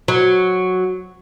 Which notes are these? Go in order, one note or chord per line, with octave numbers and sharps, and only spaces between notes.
F#3